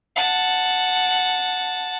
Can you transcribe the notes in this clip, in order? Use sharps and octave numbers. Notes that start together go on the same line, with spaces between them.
F#5 A5